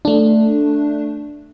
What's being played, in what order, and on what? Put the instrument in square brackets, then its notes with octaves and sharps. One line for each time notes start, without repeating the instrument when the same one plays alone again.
[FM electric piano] A3 D4